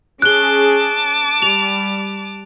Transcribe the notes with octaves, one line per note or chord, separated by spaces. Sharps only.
C#4 G#4 A5 D6 F#6 G7
G3 F7